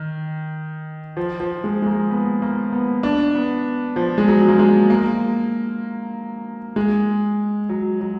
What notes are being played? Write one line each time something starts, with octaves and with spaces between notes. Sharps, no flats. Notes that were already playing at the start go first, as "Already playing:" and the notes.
Already playing: D#3
F3
F3
G#3
G#3
A#3
B3
A#3
B3
D4
B3
F3
G#3
F#3
A#3
G#3
A#3
G#3
F#3
F#3